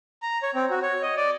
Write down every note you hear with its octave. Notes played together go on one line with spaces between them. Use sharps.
A#5
C#5
C4
F#4
C#5
D#5
D5